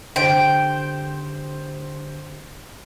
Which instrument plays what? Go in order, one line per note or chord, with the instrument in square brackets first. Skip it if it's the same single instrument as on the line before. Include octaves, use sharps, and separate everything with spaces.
[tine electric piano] D3 G4 [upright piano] C5 [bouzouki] G5